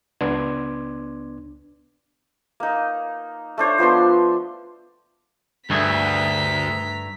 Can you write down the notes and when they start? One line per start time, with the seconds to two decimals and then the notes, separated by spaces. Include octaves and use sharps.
0.21 C#2 B3 D4 C6 D6 G#6
2.60 A#3 D#4
3.58 A3 D4 C5 C#5
3.78 F3 B3 D4 C6
5.70 D2 G2 A3 G#4 A#5 B6